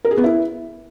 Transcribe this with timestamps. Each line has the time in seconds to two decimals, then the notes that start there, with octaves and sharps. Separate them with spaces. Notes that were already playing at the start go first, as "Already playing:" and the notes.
0.05 A#4
0.11 G#4
0.17 B3
0.24 E4